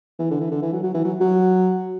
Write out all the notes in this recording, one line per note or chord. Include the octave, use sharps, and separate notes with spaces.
E3
D3
E3
D3
E3
F#3
F#3
E3
F#3
F#3